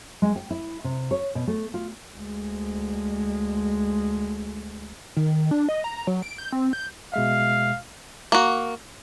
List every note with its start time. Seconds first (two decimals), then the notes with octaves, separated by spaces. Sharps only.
0.22 G#3
0.36 G5
0.51 E4
0.84 C3
1.11 C#5
1.35 B2
1.47 A3
1.74 F4
2.16 D2 G#3
5.17 D#3
5.51 D4
5.69 D#5
5.84 A#5
6.07 F#3
6.22 D7
6.38 G6
6.52 C4
6.73 G6
7.14 B2 G#3 E5 F5
8.32 A#3 F#4